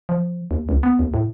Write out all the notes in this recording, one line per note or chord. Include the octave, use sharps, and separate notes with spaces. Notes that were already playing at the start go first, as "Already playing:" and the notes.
F3
D#2
C#2
B3
D#2
A2